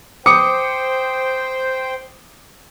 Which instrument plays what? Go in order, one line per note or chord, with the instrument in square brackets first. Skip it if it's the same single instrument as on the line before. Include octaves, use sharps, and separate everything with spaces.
[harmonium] C5 G5 [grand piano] D6 D#6 C#7